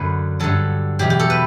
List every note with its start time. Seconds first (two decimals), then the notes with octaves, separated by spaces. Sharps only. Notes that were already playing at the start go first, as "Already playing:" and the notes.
Already playing: F#2 D3 F#3 B4
0.40 G2 D3 F#3 A4
0.99 E2 B2 F#3 G4
1.10 G4
1.20 A4
1.30 B4